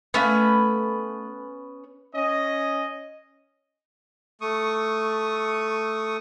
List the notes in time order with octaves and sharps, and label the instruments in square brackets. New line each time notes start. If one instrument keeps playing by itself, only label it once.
[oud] A3 F5 [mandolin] B3 C#4 B4
[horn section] C#4 D#5
[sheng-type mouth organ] A3 C#6 D#6